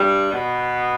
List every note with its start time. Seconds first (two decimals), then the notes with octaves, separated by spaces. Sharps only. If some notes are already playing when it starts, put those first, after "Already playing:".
Already playing: G2 G3
0.33 B2 B3